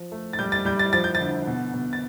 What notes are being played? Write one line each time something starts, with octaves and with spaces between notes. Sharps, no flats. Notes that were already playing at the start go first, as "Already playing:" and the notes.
Already playing: F3
A3
A6
G3 G6
A6
G3 G6
A6
F3 A6
G6
A6
D3
B2
B2
A6